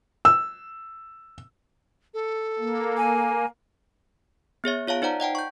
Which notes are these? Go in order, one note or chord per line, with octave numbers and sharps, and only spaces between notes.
E6
A4
A#3
G#5
B3 G#4 C#5 E5
F4 C#5 F5 A5
D#4 C5 D5 F#5 A#5
D#5 F#5 G5 A5
C#6 G6